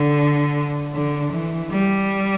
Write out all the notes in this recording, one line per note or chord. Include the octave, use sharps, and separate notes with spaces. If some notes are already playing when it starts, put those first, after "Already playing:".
Already playing: D3
D3
E3
G3